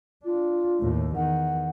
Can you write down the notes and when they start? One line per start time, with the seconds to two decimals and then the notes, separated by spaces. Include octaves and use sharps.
0.25 D4 F4
0.80 D#2 A2
1.15 E2 D#3 F#5